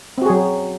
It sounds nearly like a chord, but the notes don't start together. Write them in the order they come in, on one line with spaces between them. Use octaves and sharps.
C4 F#4 G#4 F#3